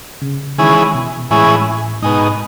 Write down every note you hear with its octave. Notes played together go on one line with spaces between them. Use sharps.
C#3
D#3 E3 G#3 C#4 E4 G#4
B2
A2 E3 G#3 C#4 E4 G#4
G#2 B2 G#3 D#4